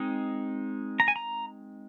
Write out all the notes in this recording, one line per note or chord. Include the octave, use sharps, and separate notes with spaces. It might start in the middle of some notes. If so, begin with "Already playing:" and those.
Already playing: G#3 C4 D#4
A#5
G#5
A#5